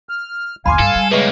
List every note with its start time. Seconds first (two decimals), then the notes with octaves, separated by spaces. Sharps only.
0.09 F6
0.66 G1 D#2 F5 G#5 B5 C6 D6
0.79 G2 A4
0.96 G3
1.11 A2 C#3 G#3 A#3 B4 E5 C#6